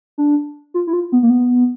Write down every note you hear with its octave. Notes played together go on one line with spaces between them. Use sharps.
D4
F4
E4
F4
B3
A#3
B3